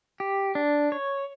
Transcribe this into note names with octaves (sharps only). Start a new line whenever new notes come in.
G4
D4
C#5